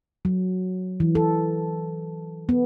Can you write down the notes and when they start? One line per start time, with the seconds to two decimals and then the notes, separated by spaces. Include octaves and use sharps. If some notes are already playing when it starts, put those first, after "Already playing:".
0.25 F#3
1.00 E3
1.15 A4
2.49 B3